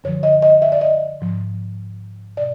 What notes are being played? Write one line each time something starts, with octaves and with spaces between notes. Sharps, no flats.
F#2 D3 F3 C#5
D#5
D#5
E5
D5
D#5
G#2 F3
B2 D5